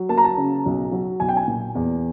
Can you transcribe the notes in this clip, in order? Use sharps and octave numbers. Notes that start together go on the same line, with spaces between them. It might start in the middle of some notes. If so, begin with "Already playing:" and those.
Already playing: F#3
A#3 A5
A#5
A5
C#3
B1
F#3
B1 G#5
G5
G#5
A#2
E2